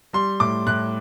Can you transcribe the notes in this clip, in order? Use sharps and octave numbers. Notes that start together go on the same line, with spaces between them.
G3 C6
A2 D6
A2 F#6